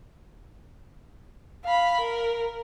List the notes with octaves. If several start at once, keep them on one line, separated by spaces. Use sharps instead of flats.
F5 B5
A#4